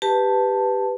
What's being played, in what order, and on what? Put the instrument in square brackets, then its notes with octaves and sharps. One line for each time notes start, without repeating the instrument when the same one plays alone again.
[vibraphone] G4 B4 A5